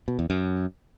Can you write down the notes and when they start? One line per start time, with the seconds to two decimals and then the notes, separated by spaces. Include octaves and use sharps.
0.08 B2
0.19 E2
0.30 F#2